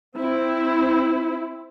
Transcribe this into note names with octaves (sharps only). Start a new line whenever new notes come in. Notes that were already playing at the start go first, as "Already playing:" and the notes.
C4 E4